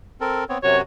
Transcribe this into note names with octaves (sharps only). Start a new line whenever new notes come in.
C4 A4 A#4
B3 C4 C#5
F#2 C3 F#4 C#5